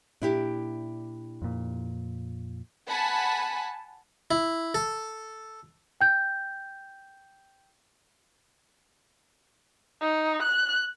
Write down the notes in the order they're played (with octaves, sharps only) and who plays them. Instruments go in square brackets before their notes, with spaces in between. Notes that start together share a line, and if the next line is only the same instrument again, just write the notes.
[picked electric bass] A#2 [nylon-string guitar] D4 E4 G4
[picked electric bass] F2 A#2
[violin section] F#5 G#5 A5 B5
[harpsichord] E4
A4
[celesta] G5 G6
[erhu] D#4
F#6